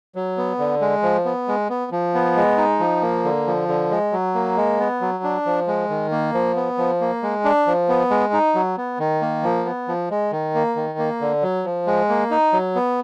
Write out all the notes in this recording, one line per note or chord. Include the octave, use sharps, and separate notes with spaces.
F#3
B3
D3
G#3
F3
B3
G#3
B3
F3
B3
G#3
D#4
F3
A#3
D3
F3
D3
G#3
F#3
A#3
G#3
B3
F#3
D4
F3
G#3
D#3
A#3
F3
B3
F3
A#3
G#3
D4
F3
B3
G#3
D#4
F#3
B3
D#3
A#3
F3
B3
F3
G#3
D#3
A#3
D#3
A#3
D3
F#3
F3
G#3
A#3
D#4
F#3
B3